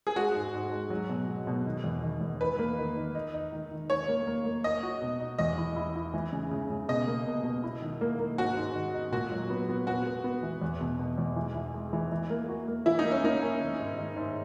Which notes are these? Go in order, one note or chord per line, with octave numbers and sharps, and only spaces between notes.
G#4
G#3 F#4
G#2
G#2
G#3
F#3
B2
F#3
B2
D#3
E2
D#3
E2
D#3 B4
A#3
D#3
D#3
D#4
D#4
D#3
D#3
D#3 C#5
A#3
A#3
A#3
D#4 D#5
F#4
B2
D#4
E2 D#5
E4
E4
E4
E3
C#3
C#3
C#3
B2 D#5
A#3
B2
B2
E4
D#3
A#3
A#3
G#2 F#4
G#2
D#3
D#4
A#2 F#4
F#3
B3
B3
B3 F#4
B3
B3
E3
E2
B2
B2
E2
E3
E3
G#3
E3
E3
A#3
F#4
A#3
E3 E4
D#4
A#3
C#4
A#3 D#4
C#4
D#3
G#2
D#3
G#2